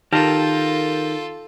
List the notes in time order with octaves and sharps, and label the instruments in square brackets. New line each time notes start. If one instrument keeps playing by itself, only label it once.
[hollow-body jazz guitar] D#3 [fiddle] F4 A4 [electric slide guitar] G4 A#4 A5